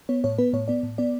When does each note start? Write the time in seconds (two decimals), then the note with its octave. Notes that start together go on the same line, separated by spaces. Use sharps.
0.09 B3 C#5
0.24 A2 C#5
0.38 B3 B4
0.53 A2 C#5
0.68 B3 D5
0.83 A2
0.98 B3 D5